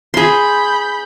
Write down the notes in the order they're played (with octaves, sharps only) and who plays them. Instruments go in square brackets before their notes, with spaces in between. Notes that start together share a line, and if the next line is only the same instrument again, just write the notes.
[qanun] G#4 C6 [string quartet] B5 G6